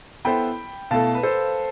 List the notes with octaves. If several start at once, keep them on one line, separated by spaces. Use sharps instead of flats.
B3 E4 A4 C5 G5 B5
B2 A3 E4 A4 F5 A5
B4
A4 C5